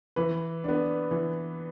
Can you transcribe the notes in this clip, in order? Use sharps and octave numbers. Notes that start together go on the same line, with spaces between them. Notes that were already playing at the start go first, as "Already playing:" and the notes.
E3 B4
B3 D4
E3